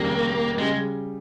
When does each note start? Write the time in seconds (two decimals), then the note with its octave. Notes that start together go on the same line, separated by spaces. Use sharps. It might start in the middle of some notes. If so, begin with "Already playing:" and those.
Already playing: F1 D#2 C#3 G3 A#3
0.58 C#3 G3 G#3